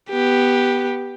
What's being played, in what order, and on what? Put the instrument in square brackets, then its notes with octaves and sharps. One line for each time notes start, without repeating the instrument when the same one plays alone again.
[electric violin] B3 G4